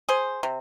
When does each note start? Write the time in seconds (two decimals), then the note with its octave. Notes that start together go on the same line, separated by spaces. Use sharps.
0.09 G#4 C5
0.43 C3